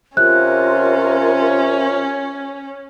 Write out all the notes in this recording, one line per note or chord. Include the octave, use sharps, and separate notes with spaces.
C3 C#4 F4 A#4 F#6